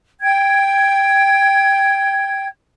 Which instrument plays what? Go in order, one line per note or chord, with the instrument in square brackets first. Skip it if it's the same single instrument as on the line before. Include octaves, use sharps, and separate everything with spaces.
[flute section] G5 G#6